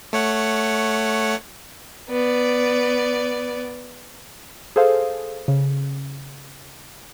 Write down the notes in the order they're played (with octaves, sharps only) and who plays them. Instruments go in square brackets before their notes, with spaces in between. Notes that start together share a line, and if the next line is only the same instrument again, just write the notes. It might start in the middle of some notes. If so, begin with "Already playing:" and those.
[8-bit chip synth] A3 C#5 F#5
[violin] B3 D5
[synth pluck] G#4 A4 C5 F5
C#3